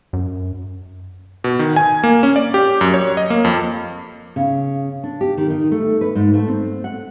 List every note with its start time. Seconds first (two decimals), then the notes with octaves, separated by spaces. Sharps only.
0.13 F#2
1.44 B2
1.59 D#3
1.76 G#5
2.04 A#3
2.23 C#4
2.36 D5
2.54 G4
2.81 F#2
2.94 C#5
3.17 D#5
3.30 A#3
3.45 F2
4.36 C#3
5.03 D4
5.21 G4
5.38 D#3
5.50 D#3
5.71 A3
6.01 B4
6.15 G#2
6.34 A3
6.48 C4
6.84 F#5